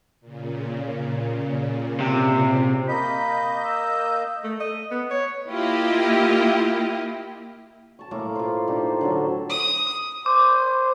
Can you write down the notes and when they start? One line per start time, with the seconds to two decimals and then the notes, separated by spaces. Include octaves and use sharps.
0.21 A#2 C#3
2.00 C3
2.89 A#3 D#5 B5 G6
3.64 E6
4.44 A3
4.60 D#5
4.91 B3
5.11 C#5
5.49 A#3 E4 F4 G4 D#5
7.99 A5 C#6
8.11 A2 A#3 F5 D6
8.35 F4 C5
8.68 D4 D#4 G4 C5
9.01 D3 F#3 A4
9.50 D#6
10.26 C5 D6